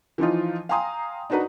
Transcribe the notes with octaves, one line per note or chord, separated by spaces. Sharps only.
E3 F3 D#4 F4
F5 G5 G#5 A#5 C6 D#6
D4 D#4 F#4 B4 A#5